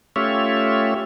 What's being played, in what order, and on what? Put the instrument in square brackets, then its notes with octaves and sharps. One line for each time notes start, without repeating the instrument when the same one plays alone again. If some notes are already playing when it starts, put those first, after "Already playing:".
[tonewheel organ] A3 C#4 F4 G4 C#5 E5